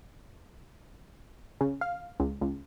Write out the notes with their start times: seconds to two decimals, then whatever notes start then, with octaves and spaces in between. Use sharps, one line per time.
1.61 C#3
1.81 F5
2.20 C#2
2.41 C#2